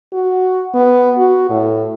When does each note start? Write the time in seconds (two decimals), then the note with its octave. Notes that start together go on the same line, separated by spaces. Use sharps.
0.13 F#4
0.74 B3
1.18 F#4
1.50 A2